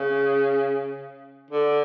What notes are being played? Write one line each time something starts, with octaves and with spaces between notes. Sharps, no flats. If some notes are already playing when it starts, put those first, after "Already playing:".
Already playing: C#3
D3